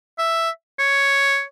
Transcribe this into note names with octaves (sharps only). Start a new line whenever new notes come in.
E5
C#5